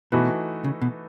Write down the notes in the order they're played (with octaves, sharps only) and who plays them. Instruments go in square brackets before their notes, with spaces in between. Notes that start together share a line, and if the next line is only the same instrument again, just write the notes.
[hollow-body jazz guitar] B2 [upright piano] E3 A3 D#4 F#4 B4
[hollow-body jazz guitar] C#3
B2